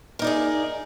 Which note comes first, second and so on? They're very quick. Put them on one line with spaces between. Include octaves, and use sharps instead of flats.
A#4 D#4 D5 G#4